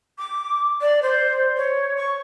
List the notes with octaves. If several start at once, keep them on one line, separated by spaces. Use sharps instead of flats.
D6
D5
C5
C#5
C#6